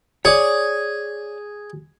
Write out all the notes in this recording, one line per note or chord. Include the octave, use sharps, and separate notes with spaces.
G#4 C#5 D5